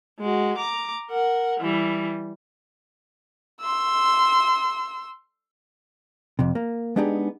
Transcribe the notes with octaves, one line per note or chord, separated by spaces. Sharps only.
G#3 F#4
A#5 D6
A#4 F#5
E3 G3
C6 E6
F2 C3
A#3
G#3 B3 D4 D#4 G4 G#4